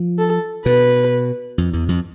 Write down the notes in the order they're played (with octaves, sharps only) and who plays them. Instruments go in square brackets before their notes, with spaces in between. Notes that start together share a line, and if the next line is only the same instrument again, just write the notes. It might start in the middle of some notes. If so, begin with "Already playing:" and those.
Already playing: [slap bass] F3
[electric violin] A4
[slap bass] B2 [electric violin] B4
[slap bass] F2
E2
F2